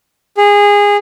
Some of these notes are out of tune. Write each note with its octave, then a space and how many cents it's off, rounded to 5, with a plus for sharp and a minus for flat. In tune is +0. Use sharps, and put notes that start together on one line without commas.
G#4 -20